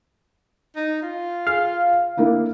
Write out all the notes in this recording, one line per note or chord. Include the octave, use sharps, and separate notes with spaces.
D#4
F4
G#4 F5
A#3 D4 E4